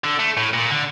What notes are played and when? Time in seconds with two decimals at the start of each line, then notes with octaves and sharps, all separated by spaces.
0.04 D3
0.19 A3
0.37 A2
0.54 A#2
0.71 D3